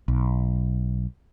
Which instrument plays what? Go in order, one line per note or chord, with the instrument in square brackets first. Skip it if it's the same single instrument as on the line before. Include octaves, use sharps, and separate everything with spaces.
[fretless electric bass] B1